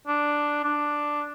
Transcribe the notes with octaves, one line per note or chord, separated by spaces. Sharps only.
D4
D4